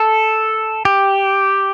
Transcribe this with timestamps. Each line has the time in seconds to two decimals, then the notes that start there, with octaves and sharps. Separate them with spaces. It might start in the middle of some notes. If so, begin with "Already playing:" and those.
Already playing: A4
0.85 G4